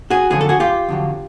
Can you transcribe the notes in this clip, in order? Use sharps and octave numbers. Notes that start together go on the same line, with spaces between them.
F#4 G#4
F2 D3 F#3 G#4
A4
F#4 G#4
F4 G4
F2 D3 F#3